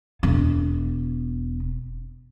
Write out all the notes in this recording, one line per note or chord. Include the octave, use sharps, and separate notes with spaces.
E1 B3